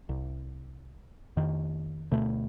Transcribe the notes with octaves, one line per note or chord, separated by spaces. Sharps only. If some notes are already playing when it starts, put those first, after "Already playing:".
C2
F2 D#3
D2 B2 A3